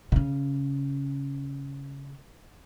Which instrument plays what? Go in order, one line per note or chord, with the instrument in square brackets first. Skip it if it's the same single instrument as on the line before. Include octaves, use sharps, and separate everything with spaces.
[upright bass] C#3 C#4